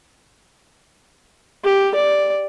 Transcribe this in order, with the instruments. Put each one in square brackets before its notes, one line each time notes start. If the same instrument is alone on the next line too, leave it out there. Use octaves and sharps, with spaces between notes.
[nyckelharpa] G4
D5